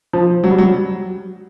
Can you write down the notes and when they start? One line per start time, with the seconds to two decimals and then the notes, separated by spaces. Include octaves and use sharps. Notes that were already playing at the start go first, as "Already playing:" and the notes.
0.13 F3
0.44 F#3
0.51 G3
0.58 F#3